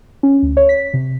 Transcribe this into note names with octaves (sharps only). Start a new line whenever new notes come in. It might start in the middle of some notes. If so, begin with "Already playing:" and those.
C#4
D2
C#5
B6
C3